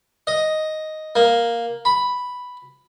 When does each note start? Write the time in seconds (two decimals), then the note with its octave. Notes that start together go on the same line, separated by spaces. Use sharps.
0.27 D#5
1.16 A#3
1.85 B5